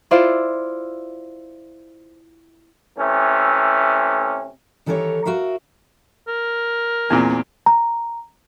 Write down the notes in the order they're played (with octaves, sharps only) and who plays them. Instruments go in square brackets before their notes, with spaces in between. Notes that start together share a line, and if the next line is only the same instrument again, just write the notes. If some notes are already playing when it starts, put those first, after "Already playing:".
[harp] E4 F4 C5 D5 E5 F5
[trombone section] C3 E3 A3 C#4
[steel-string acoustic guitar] D#3 E3 G4 A4 A#4 C#5
F#4 A#4 E5 F5
[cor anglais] A#4
[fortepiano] E2 A#2 [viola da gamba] C4
[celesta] A#5